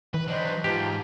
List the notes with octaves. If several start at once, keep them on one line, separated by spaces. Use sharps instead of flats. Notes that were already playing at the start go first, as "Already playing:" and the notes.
E3 B4
F#3 D4 B4 C5 D#5
G#2 F4 G4 A5 A#5